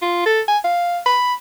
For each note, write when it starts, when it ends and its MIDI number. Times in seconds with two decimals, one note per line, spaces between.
0.02 0.22 65
0.26 0.41 69
0.48 0.58 80
0.64 0.99 77
1.06 1.34 83